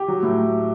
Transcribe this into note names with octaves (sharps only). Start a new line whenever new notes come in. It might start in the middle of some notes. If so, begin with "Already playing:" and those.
Already playing: G4
F#3
A2